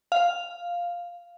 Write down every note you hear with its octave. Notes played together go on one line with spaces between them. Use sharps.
F5